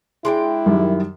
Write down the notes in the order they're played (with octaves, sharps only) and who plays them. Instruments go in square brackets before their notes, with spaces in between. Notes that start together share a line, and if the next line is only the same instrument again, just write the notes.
[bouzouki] G#3 D4 G5 [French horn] E4
[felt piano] F#2 D#3 G3